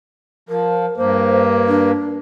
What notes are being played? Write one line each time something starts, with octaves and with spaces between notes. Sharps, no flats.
F3 A#4
G2 A#3 C5
D4